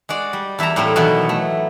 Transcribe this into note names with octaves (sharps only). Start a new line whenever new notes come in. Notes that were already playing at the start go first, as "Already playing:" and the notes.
G#3 F#4 D5
G3
E2 E4 E5 A5 A#5
A2 G3 A3 A#3 C4
B2 D#3 E3 F#3 B3
A3